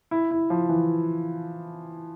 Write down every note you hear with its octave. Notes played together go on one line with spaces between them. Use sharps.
E4
E4
F3
E3